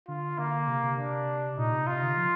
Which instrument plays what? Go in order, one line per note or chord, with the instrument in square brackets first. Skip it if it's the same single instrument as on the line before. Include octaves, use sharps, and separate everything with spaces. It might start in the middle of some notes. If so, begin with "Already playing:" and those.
[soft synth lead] D3 [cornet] F4
[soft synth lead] D3 [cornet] A#3
[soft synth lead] C3
C3
[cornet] D4
[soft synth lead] A#2 [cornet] D#4
[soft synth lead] C3
[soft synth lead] C3 [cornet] F4
[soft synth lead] D3
F3